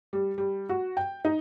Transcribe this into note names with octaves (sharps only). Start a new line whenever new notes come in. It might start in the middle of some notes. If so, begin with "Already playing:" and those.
G3
G3
F#4
G5
D#4